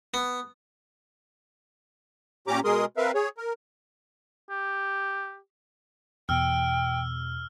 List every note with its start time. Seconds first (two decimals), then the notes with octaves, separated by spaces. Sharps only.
0.14 B3
2.48 A#2 C#4 G4 A#5 D6
2.65 B2 G#3 G#4 A#4 C6 D#6
2.97 C4 A#4 B4 E5 F5
3.15 G#4 C#5
3.38 A#4
4.50 G4
6.29 E2 B2 G5 E6 F6